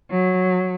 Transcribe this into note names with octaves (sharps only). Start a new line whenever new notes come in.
F#3